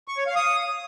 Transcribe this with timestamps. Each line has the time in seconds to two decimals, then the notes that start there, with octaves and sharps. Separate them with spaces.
0.08 C#6
0.17 C#5
0.27 F5
0.36 D#6